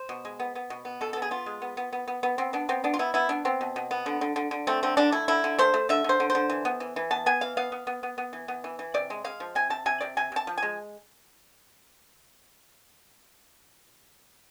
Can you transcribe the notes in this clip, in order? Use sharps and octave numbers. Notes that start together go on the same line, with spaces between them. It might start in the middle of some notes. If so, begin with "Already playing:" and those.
Already playing: C5
B2
G#3
B3
B3
B2
B3
B2 A4
B3 A4
G#4
B3 F4
G#3
B3
B3
B3
B3
B3
B3 C4
B3 D4
B3 C4
B3 D4
F4
B3 E4
B3 E4
B3 D4
B3 C4
B2
B2
B3
D3
D3
D3
D3
A3 C4
D3 C4
D3 D4
A3 E4
D3 E4
D3
A3 C5
A3
D3 E5
D3 C5
D3
C5
D3
E3
B3
E3
E3
B3 A5
B3 G#5
E3 F5
B3 F5
B3
B3
B3
B3
E3
B3
E3
E3
C3 D5
G#3
G#3 F5
F3
C3 G#5
C3 A5
C3 G#5
C3 D5
C3 G#5
C3 A5
F3
G#5
G#3